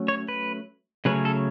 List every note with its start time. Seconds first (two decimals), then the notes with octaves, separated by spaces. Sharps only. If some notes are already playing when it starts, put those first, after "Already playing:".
Already playing: F#3 A3 C#4
0.08 C#5
0.28 B4
1.05 C#3 F#3 A3 C#4 B4
1.25 A4